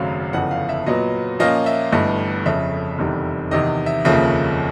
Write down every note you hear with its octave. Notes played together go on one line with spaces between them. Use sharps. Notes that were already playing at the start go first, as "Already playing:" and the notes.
Already playing: G#1 F#2 C#3 F#3 A3 F5
G1 F2 C#3 E3 F#5
F5
E5
A#2 F#3 B3 D#5
A#2 F3 A#3 C#4 F4 D#5
E5
G1 G2 E3 A3 D#5
F1 F2 C#3 E5
F1 E2 C3 D#3 G3
E2 C3 D#3 D#5
E5
F1 D#2 C#3 F3 A#3 E5